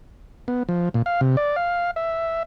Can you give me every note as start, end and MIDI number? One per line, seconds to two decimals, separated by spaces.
0.48 0.63 59
0.69 0.89 53
0.94 1.02 46
1.06 1.21 77
1.21 1.36 48
1.37 1.56 74
1.56 1.91 77
1.96 2.43 76